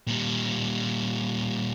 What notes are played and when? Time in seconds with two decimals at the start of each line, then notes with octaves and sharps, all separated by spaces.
0.07 A#2 G3